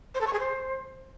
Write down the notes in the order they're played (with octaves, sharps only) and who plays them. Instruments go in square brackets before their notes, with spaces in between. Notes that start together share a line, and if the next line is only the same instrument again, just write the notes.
[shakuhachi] C5
A4
C#6
G#4
C5